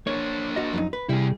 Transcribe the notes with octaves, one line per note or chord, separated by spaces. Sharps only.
A#3 D4 C#5
F#4 D#5
F2 F#3 D#4
B4
C3 G3 E4 G#4